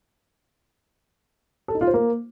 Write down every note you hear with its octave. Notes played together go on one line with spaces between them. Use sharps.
A4
D#4
F4
C5
A#3